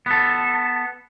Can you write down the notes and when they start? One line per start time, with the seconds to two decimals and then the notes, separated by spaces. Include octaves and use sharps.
0.06 B3 A4